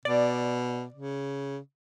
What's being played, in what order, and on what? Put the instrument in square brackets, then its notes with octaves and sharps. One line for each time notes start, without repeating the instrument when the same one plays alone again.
[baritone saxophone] B2 [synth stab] D5
[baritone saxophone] C#3